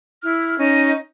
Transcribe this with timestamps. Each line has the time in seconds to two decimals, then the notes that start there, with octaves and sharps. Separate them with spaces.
0.22 E4 F6
0.57 C#4 D#4